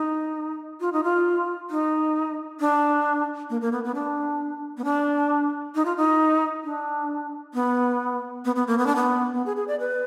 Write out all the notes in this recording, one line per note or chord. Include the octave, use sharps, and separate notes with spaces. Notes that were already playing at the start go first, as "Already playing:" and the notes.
Already playing: D#4
F4
D#4
F4
D#4
D4
A#3
A#3
B3
B3
D4
B3
D4
D#4
F4
D#4
D4
B3
B3
B3
A#3
B3
D4
B3
B3
G#4
G#4
D5
B4